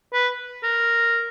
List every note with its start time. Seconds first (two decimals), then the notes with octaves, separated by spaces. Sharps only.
0.13 B4
0.64 A#4